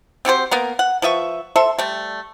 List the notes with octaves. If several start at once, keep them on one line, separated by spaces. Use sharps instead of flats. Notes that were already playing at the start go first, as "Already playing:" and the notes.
C4 F#4 G4 C5
A#3 B3 A#4
F#5
F3 B4 E5 C#6
A4 C5 E5
G3 A3